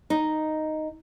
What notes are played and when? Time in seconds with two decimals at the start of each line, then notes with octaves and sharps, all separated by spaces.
0.10 D#4